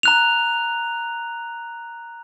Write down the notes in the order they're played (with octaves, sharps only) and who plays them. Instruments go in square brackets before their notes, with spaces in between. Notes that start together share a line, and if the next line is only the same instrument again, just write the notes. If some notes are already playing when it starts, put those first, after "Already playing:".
[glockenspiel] A#5 F#6 F7